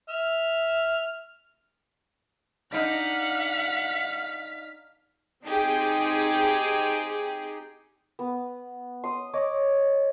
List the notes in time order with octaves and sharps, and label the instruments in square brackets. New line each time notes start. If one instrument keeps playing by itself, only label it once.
[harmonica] E5 F6
[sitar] D4 D#4 [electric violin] F5 B6 [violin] F#5
[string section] C4 D#4 G4 G#4
[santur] B3
C6 D#6
C#5 D#5 D6